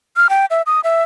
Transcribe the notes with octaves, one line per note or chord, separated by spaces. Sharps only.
F6
G5
E5
D#6
E5